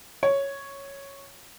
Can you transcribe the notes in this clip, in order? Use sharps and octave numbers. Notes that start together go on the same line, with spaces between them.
C#5